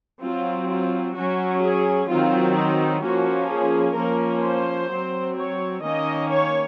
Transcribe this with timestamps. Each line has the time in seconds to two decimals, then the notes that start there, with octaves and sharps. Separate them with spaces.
0.22 F#3 C4 F4
0.69 F4
1.16 F#3 C#4 F#4
1.63 G#4
2.09 D#3 F#3 C4 F4
2.56 D#4
3.03 F3 A#3 C#4 F#4
3.49 G#4
3.96 F3 A#3 C#4 A#4
4.44 C5
4.90 F#3 C4
5.37 C#5
5.83 D#3 A#3 C#4 D#5
6.30 C#5